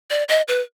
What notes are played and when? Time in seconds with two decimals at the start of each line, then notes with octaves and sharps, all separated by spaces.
0.10 D5
0.29 D#5
0.48 B4